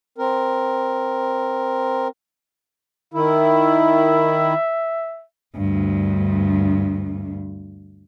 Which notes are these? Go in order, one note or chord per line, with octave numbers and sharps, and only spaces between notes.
C4 A#4
D#3 E4 E5
D2 G2